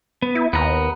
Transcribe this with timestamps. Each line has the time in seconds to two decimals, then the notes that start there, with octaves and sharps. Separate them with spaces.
0.22 B3
0.35 E4
0.53 D#2 B3 A#5